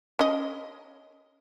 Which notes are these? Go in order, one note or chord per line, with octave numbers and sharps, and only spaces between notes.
C#4 D#5